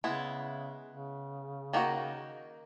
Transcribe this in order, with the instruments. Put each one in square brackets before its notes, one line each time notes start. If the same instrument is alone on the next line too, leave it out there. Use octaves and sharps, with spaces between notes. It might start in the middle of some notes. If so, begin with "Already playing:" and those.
[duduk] C#3 [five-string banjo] G#3 B3 E4
[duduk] C#3
[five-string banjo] D#3 A#3 D#4 F#4